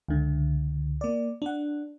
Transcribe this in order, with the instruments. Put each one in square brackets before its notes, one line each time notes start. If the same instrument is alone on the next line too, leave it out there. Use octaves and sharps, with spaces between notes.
[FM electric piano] C#2 D3
A#3 D5
D4 F#5